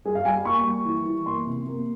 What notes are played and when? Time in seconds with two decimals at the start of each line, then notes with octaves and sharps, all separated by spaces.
0.05 G3 G#4
0.15 F5
0.25 G3 G#5
0.45 A#3 C#6
0.66 G3
0.85 E3
1.05 E3
1.26 A#3 C6
1.46 C3
1.66 A#3